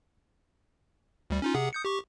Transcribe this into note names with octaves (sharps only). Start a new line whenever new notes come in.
D2 G3
C#4 D#4 F4
C3 G#4 F#5
D#6 G6 C#7
G4 C#6